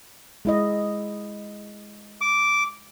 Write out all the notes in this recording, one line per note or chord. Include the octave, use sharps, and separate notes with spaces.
G#3 E4 D#5
D6